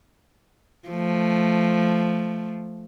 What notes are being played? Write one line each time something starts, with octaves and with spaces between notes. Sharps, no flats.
F3 A3